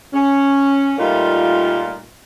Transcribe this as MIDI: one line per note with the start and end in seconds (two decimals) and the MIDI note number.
0.13 0.94 61
0.99 2.06 46
0.99 2.06 55
0.99 2.06 57
0.99 2.06 58
0.99 2.06 63
0.99 2.06 65